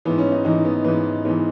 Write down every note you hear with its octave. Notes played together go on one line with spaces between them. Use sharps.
G#2 E3 B3
C#4
D#4
G#2 E3 D#4
B3
G#2 E3 B3
G#2 E3 B3